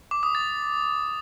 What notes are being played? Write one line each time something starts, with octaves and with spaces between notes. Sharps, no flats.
D6
D#6
A6